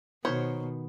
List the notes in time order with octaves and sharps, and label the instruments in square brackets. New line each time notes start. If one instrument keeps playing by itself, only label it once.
[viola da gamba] B2 [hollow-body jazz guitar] D#3 B3 [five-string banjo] A#4 C5 C#5